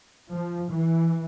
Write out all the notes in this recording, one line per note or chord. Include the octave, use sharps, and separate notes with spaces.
F3
E3